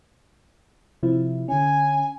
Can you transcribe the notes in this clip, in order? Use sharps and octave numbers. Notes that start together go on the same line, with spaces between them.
C3 F3 E4
D3 C#4 G#5